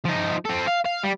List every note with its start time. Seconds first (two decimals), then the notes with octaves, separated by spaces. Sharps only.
0.05 F3 D#4
0.45 C4 A4
0.67 F5
0.85 F5
1.03 G3